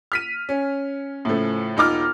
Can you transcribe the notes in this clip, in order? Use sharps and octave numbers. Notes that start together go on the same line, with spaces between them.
F6 B6 D#7
C#4
A2 C#3 F3 A3
E1 D#4 F4 D6 F6